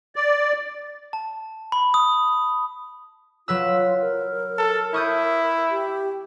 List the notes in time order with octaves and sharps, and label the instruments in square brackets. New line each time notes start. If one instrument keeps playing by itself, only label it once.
[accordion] D5
[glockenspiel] A5
B5
D#6
[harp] F#3 B4 E6 [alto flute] F4
[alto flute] A#4
[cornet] A4
[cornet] E4 [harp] C#6 D#6 G6
[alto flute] G4